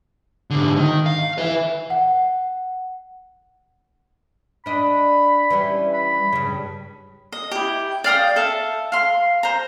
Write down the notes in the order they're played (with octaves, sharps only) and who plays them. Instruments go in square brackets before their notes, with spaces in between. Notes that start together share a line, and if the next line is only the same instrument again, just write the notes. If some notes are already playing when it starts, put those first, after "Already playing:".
[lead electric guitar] G#2 D3
D#3
F5
B4 E5
[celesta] F#5
[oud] D4 D#5 [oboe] B5
[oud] E3 G3 C#4
[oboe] B5
[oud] G2 C#3
[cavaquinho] D#5
E4 G4
D5 F5 G5 D#6
A4 E5 F5
F5 C6
C5 A#5